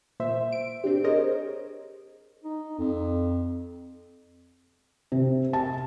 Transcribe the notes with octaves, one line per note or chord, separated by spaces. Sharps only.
A#2 C5 E5
D7
C4 D4 G4
G#4 A#4 C5 C#5 D#5
D#4
F2
C3
A5